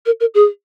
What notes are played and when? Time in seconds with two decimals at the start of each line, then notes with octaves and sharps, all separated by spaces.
0.06 A#4
0.20 A#4
0.34 G#4